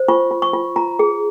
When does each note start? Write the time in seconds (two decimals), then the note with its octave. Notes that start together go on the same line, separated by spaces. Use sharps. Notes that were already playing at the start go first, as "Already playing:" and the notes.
Already playing: C5
0.08 F4 C#6
0.31 F4
0.42 C#6
0.53 F4
0.76 F4 A#5
0.99 G#4